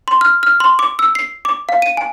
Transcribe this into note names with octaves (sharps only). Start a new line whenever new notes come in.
C6
F6
F6
C6
D6
E6
C7
D6
F5
D#7
G#5